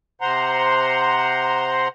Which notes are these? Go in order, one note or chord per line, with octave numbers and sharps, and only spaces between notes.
C3 C5 F#5 A#5 C6